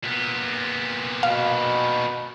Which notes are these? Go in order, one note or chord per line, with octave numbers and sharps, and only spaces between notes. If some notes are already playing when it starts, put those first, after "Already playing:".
A#2 B3
B2 F5